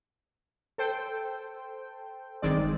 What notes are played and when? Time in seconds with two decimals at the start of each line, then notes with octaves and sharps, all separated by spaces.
0.78 A4 C5 G5
2.42 G1 D#3 G#3 C4 D5